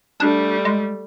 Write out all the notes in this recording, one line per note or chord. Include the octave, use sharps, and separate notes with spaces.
G3 A3 D4
G#3